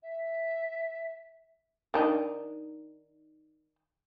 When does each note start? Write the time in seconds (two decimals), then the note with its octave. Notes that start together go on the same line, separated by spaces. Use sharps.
0.02 E5
1.94 D#3 D4 D#4